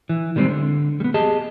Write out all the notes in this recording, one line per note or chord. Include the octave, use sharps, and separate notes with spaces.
E3
D#3 G3 G#3 A#3 C4
D3
G3 B3
G4 G#4 D#5 A5